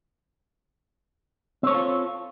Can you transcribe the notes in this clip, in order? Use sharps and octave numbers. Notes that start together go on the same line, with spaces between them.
C4 F4 A4 C#5